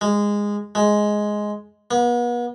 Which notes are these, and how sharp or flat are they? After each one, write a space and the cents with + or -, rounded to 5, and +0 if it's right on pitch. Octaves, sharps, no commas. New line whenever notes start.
G#3 -15
G#3 +5
B3 -40